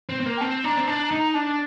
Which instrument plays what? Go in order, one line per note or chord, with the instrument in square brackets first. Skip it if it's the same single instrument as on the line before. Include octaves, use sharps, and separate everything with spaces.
[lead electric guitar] C4
C4
A#3
[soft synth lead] G5
[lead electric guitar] C4 [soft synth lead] A5
[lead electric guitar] D4 [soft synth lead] A#5
[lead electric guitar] C4
[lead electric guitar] D4 [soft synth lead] A5
[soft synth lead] A#5
[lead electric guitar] D#4
[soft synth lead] A#5
[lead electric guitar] D4 [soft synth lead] A5